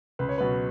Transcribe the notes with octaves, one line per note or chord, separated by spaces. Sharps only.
C#2 B4
C#5
B2 F#3 B4